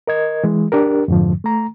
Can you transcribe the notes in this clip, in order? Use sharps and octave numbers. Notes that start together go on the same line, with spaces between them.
A#4 D#5 G#6
E3 G#3
D4 G4 A#4
F2 G#2 D3 F3
A3 A#5